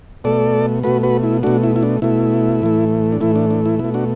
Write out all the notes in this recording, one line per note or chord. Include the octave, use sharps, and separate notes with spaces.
B2 A3 A4 D5
B2 A3 F#4 B4
F#4 B4
E4
B2 A3 D4 F#4
E4
E4
D4
B2 A3 E4
A2 E3 A3
D4
A2 E3 A3 E4
D4
D4
E4
B2 E4
A3
D4 F#4